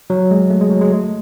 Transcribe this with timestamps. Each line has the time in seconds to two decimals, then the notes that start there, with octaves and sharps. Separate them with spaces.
0.10 F#3
0.31 G#3
0.50 A3
0.61 G#3
0.70 F#3
0.81 G#3
0.91 A3